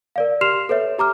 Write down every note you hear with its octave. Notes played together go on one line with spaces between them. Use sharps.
A#4 D5 F5
G4 C6 F6 C7 E7 F7
A4 B4 C#5 E5
G4 A#5 D6 F6